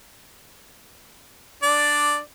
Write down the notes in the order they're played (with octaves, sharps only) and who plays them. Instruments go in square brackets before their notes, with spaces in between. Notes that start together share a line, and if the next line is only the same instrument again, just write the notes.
[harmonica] D4 D5